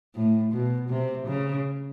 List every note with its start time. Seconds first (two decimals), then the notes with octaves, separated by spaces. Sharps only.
0.15 A2
0.52 B2
0.89 C3
1.27 C#3